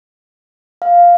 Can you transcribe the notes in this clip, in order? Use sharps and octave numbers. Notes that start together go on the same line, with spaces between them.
F5